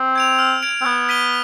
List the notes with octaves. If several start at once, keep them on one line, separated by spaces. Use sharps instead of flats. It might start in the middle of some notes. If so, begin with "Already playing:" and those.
Already playing: C4
G#6 D7 F7
F6
G#6 D7 F7
C4
B3 G#6
B6 D#7 G7